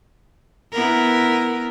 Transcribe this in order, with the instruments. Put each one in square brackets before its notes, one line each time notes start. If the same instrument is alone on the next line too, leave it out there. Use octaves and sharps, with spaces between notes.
[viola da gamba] B3 E4 A#4